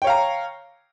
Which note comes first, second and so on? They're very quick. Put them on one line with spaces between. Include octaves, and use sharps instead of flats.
G5 C#5 F5 A#5